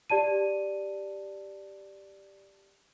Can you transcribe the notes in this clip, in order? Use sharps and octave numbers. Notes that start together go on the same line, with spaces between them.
G4 D5 A5 D#7